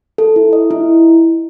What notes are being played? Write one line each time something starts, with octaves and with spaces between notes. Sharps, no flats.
A4
E4
D#5
E4